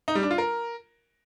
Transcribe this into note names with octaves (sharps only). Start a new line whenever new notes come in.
D#4
G3
D4
F4
A#4